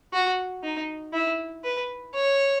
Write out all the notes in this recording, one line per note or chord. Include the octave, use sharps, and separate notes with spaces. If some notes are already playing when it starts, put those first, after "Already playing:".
F#4
D#4
E4
B4
C#5